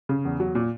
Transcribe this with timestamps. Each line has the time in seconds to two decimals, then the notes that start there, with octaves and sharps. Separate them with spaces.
0.09 C#3
0.25 E2
0.40 F#3
0.55 A#2